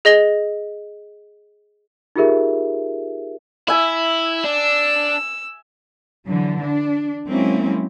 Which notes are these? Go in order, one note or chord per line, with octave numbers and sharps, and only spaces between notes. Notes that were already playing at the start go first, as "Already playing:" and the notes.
G#4 D#5 A#6 G7
D#4 F4 G4 G#4 A#4 E5
E4 E5 G#5
D4 E6
D3 E3 F#3
D4
F#3 G#3 A#3 C4 C#4 E4